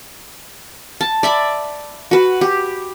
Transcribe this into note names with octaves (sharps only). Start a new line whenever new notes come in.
A5
D5 E5 B5
F#4 B4
G4